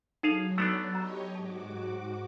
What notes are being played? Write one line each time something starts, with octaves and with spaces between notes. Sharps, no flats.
F#3 D#4 G#4 A4 F5
A3 B3 D4 E6
G4 C#5 D#5 A#5
G#2 F#4 A5 D6